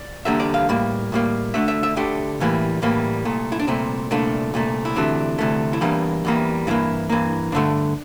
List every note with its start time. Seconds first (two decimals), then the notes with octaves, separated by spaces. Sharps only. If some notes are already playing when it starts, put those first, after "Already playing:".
Already playing: D5
0.25 E2 D3 G3 A#3 E5
0.40 D5
0.54 F5
0.69 A2 G3 A#3
1.12 A2 G3 A#3
1.54 D2 D3 A3 E5
1.68 E5
1.83 E5
1.96 D2 D3 A3 G4
2.40 A2 E3 G3 A#3
2.82 A2 E3 G3 A#3
3.25 C2 A#2 A3
3.52 E4
3.60 D4
3.67 C2 A#2 A3 C4
4.11 C2 A#2 A3 D4
4.54 C2 A#2 A3
4.85 E4
4.96 D2 C3 E3 A3 D4
5.38 D2 C3 E3 A3
5.73 E4
5.81 E2 E3 G3 A#3 D4
6.25 E2 E3 G3 A#3
6.67 G2 E3 A#3 E4
7.09 G2 E3 A#3
7.52 G2 D3 A3 D4